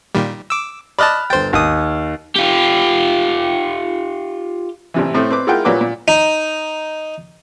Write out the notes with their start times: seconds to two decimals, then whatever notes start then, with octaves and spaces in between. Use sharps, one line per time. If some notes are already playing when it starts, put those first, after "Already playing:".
0.15 A#2 D#3 G3
0.50 D6 E6
0.99 D5 D#5 A5 B5 F6 F#6
1.30 G1 C5 G5 A6
1.53 G#1 D#2 D#6
2.36 F4 G4
4.94 A1 C3 E3
5.14 A2 A3 C4
5.30 C4 B4 D6
5.47 G#3 E4 F4 A#4 F#5 G5
5.65 A#2 F#3 G3 F#4 B4 D6
5.81 A#2
6.08 D#4